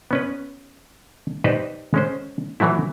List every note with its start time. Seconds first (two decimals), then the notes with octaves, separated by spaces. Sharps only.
0.11 B3 C#4 B4
1.44 D#4 G4 B4 C5 D5 D#5
1.94 G#3 C#4 C5
2.60 E3 F#3 A3 E4